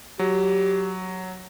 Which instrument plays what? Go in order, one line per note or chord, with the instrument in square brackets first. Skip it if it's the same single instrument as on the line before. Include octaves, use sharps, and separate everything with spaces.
[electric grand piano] F#3 [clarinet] G4